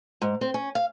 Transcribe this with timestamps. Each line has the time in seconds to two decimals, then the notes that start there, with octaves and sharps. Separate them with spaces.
0.22 G#2
0.41 C4
0.54 C#4
0.75 F5